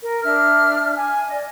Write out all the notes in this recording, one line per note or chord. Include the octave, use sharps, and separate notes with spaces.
A#4
D4 E5 F6
G#5
D5 D#5